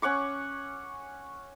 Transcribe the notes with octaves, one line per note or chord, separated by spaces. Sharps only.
C#4 F#5 C#6 D6